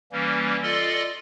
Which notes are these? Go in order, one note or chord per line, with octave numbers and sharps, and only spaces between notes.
E3 G3 A#3 C#4
F4 A4 D5 D#5 C6